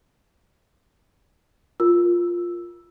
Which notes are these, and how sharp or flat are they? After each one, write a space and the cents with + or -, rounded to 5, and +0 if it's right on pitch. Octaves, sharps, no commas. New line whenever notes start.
F4 +0 A#4 +0 E6 +0